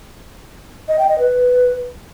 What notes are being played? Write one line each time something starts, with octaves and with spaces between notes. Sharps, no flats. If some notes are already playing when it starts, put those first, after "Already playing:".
D#5
G5
D#5
B4